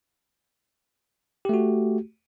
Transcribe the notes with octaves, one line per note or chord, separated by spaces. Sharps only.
A3 F#4 G4